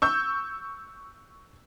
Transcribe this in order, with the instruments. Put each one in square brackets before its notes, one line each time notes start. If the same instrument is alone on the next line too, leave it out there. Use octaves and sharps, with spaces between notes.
[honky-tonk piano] C#6 E6 G6